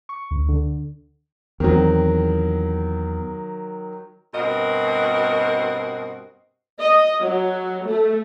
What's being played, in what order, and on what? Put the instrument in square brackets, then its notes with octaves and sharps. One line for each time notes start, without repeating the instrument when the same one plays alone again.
[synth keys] C#6
D2
D3
[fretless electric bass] E2 C4 [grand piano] D#3 F#3
[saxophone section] G2 B2 C4 F#4 A#4 D#5
[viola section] D#5
F#3
A3